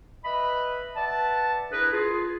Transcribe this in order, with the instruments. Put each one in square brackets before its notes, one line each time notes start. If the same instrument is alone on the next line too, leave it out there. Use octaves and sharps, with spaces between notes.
[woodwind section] B4 D#5 E5 B5
B4 D5 E5 F#5 A5
D4 E4 G#4 A#4 B4
F4 G#4